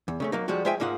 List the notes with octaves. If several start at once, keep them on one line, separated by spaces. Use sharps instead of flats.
E2
C#3 A3 C#4
F#3 A#3 D#4
F3 G3 G#3 F#4
G#3 F4 C5 E5 G5 G#5
G#2 A#3 D#4 F4 F#5